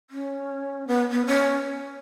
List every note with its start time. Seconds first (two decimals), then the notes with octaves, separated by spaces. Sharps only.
0.10 C#4
0.87 B3
1.11 B3
1.26 C#4